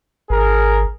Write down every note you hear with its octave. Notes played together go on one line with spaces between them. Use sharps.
G#1 G#4 A#4